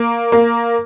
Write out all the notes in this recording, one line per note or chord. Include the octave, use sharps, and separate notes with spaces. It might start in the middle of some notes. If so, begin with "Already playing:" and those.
Already playing: A#3
A#3